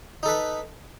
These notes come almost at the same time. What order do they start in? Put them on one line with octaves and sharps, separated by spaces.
D#4 A4 B4